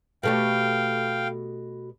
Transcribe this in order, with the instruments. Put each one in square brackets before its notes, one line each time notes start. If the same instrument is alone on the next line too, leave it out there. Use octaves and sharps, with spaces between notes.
[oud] B2 A3 G4 [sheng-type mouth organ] F5 G5